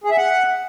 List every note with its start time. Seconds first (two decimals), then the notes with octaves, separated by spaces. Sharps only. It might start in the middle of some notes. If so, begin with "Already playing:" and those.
0.04 G#4
0.11 E5
0.17 F#5